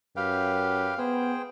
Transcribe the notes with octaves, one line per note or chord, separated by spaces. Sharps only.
F#2 G4 B4 F5 G5
B3 G#4 C5 G5